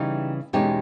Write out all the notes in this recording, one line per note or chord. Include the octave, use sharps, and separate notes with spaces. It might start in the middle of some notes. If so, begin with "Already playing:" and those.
Already playing: C#3 E3 G3 D#4 G4
E2 B2 G#3 C#4 D#4 G4